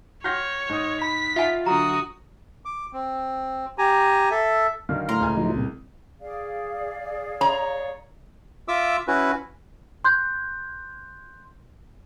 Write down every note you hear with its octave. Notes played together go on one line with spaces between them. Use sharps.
F#4 C#5 F#5 G5 F6 G6 A#6
G#2 D#6
B5 B6
F4 E5 F#5 G#5
D3 F#3 F#4 A#5 D#6
D6
C4
G4 G#5 A#5
A4 E5
D3 D#3 F#3 F5
A2 A#5 C6
C#2 G#5
F3 F#3 D#4
C2 A#2
G#4 D5 F5
C#5 A#5
F4 E5 D6 E6
C#4 E4 F#4 B4
C6 F#6 G6